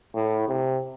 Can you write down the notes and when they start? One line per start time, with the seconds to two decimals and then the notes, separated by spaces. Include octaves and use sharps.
0.14 A2
0.48 C3